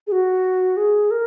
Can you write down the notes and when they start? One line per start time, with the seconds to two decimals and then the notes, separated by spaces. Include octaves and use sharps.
0.07 G#4
0.12 F#4
0.77 G#4
1.11 A#4